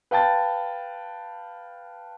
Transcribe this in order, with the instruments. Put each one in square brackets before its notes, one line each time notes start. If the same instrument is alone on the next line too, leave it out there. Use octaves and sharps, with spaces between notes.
[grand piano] B4 F5 G5 A5 A6